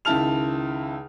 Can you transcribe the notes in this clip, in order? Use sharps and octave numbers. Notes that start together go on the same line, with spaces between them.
C#2 D#3 E4 A5 F6 F7